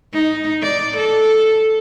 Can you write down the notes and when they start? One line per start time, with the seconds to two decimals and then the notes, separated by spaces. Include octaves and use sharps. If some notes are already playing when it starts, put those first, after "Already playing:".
0.14 D#4
0.62 D5
0.97 A4